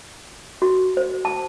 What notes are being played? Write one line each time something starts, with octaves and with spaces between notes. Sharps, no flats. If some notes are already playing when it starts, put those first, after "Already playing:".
F#4
C5
A5